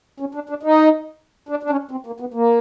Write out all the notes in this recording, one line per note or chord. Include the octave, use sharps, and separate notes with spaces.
C#4
D4
D4
D#4
D4
D4
C#4
C4
A#3
B3
A#3